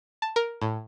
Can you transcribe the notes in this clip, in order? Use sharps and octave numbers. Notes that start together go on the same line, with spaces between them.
A5
A#4
A2